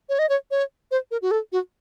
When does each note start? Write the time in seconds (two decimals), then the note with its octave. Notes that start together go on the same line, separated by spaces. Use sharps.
0.09 C#5
0.19 D#5
0.29 C#5
0.51 C#5
0.91 C5
1.11 A#4
1.22 F#4
1.31 A4
1.52 F#4